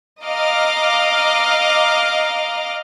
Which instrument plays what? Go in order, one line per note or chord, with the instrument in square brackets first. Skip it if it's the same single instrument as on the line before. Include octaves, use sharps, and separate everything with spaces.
[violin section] D#5 F5 A#5 D6 F6